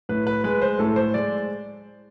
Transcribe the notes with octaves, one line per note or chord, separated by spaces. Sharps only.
A2 B4
B4
G#3 B4
C5
A2 A4
C5
G#3 D5